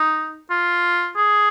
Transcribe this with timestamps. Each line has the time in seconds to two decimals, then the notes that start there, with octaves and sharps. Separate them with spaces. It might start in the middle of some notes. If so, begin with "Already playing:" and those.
Already playing: D#4
0.50 F4
1.16 G#4